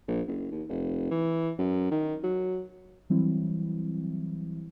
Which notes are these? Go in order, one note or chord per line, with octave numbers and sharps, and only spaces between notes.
A#1
F#1
D#2
F1
E3
F#2
D#3
F#3
E3 F#3 G3 C4 E4